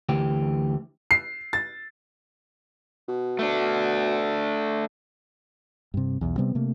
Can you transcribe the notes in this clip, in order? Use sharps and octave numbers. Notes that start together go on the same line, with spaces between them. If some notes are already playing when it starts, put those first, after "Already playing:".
D2 E3 G4
C7
A6
B2
A3 D4
G2 C3
B1 E2
C3 G3 B3 C4
C3 A3 A#3